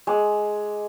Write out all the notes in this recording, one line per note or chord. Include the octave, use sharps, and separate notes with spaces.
G#3 D6